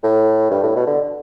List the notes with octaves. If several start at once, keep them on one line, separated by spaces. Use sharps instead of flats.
A2
G2
A2
B2
D3